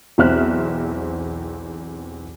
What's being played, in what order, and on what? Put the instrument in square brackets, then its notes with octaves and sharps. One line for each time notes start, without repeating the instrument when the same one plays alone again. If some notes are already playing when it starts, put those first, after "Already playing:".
[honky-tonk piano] B1 E2 C4 E5 F6 F#6